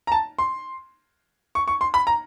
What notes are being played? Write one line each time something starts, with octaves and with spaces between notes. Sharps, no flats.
A#5
A5
C6
C#6
C#6
C6
B5
A#5